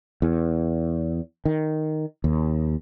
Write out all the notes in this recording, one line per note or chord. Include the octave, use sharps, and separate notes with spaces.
E2
D#3
D#2